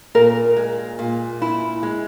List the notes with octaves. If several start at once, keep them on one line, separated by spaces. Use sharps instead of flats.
A#2 A#4
G#3
A#2
E4
G#3